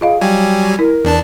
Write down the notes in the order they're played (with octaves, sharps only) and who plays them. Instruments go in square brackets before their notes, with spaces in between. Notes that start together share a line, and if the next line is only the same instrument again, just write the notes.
[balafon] F4 D#5 F5 [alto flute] G#4
[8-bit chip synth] F#3 G3 G#5 [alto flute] G5
[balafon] E4 [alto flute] A#4
[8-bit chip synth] E2 D4 A5